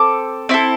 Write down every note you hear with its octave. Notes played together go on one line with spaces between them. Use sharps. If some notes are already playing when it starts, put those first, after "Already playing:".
Already playing: C4 A4 D6
C4 E4 A4